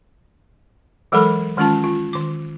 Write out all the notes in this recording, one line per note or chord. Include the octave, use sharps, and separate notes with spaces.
E3 F#3 G#3 A4 A#4 B5
D#3 G#3 C#4 F4 A5
F4
D#3 D6